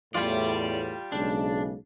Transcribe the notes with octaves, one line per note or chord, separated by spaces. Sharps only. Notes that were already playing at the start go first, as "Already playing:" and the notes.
E2 A2 G3 F4 D5
B1 C#3 G#3 D4